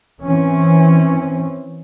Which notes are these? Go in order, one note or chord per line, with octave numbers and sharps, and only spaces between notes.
E3 C4 C#4